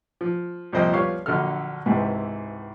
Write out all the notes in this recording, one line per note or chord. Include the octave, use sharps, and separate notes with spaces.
F3
C2 F2 A#2 C5 D#5 G5
F3 G3 B3 C#5 F5 C#6
A#1 D3 F#3 A4 F6
C#2 G#2 C3 E3